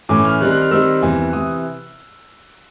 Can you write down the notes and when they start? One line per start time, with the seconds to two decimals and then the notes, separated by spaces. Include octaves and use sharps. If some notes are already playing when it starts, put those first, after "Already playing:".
0.09 A2 E3 A3 C#4 D6
0.25 F6
0.40 D#3 G3 C4 D#4 F#6
0.50 F#6
0.62 F6
0.71 D#3 G3 C4 D#4 E6
1.02 E2 C3 E3
1.33 C3 E3 D#6